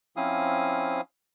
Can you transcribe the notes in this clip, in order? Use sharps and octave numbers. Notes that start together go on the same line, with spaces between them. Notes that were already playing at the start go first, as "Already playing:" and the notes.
F3 C4 C#4 E4 F5 D#6